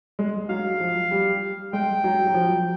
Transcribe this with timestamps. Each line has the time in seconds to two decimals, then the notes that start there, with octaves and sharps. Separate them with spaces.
0.19 G#3
0.49 F#3 F5
0.80 F3
1.11 G3
1.73 G#3 G5
2.04 F#3
2.27 F#3
2.34 F3